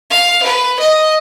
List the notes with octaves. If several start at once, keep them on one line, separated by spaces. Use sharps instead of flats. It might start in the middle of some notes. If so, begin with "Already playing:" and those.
F5
B4
D#5